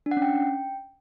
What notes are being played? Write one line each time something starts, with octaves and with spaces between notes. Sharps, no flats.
D4
F#5
C#4
G5